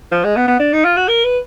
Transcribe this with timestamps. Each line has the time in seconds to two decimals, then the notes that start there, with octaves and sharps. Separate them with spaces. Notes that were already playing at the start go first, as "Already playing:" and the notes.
0.12 F3
0.24 G#3
0.37 B3
0.48 B3
0.60 D4
0.73 D#4
0.85 F4
0.97 F#4
1.09 A#4
1.24 B4